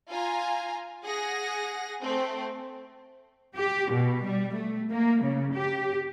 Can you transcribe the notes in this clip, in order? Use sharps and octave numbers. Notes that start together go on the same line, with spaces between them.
F4 G#5 A#5
G#4 F#5 A#6
A3 C4
G4
B2
G3
A3
A#3
C#3
G4